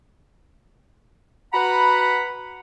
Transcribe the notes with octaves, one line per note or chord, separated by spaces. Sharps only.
F#4 B4 F#5 A#5 B5